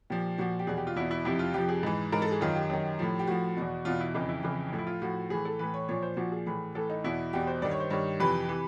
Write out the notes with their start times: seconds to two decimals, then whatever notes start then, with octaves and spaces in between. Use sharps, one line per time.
0.10 A#2 F3 G4
0.38 A#2 F3 F#4
0.59 G4
0.67 E2 B2 G#4
0.77 G4
0.87 F4
0.96 E2 B2 E4
1.11 E4
1.25 F2 C3 F3 E4
1.39 F4
1.54 F2 C3 F3 G4
1.69 G#4
1.83 G#2 E3
2.12 G#2 E3 A#4
2.22 A4
2.31 G#4
2.41 F#2 D#3 F4
2.55 G4
2.70 F#2 D#3
2.99 A2 F3
3.19 G4
3.27 A2 F3 F#4
3.57 E2 B2
3.85 E2 B2 F4
4.00 E4
4.15 F2 C#3 E3 D#4
4.29 E4
4.43 F2 C#3 E3
4.73 A2 F3
4.78 E4
4.87 F4
5.02 A2 F3 F#4
5.30 A2 E3 G#4
5.45 A4
5.59 A2 E3 B4
5.74 C#5
5.89 A#2 F3 C#5
6.03 C5
6.17 A#2 F3 F#4
6.32 G#4
6.46 A2 E3
6.75 A2 E3 A4
6.90 D#4
7.04 E2 B2 E4
7.33 E2 B2 G4
7.47 C5
7.62 G2 D#3 D5
7.71 C#5
7.80 C5
7.90 G2 D#3 C#5
8.20 F2 C3 E3 B4
8.49 C3 E3